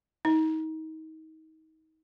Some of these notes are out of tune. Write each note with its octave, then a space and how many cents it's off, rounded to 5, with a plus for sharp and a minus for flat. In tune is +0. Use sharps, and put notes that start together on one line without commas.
D#4 +30